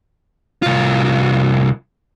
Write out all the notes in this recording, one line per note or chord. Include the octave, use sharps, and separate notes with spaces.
C2 F4